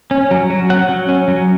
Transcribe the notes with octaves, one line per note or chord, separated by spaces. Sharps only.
C#4
F#3
F#3
C#4 F#5
F#3
C#4
F#3